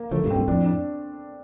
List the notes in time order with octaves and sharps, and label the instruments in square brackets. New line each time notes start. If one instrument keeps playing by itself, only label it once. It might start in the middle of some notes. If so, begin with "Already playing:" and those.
Already playing: [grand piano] A#3
[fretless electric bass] D3 F3 [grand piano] A3
[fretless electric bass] G2 A#2
[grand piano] C4
[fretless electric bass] G2 A#2
[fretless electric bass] F2 A2 [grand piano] D4
[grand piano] D4